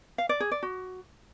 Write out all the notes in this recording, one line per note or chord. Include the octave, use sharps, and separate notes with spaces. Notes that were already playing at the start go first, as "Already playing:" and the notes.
F5
D5
G#4
D5
F#4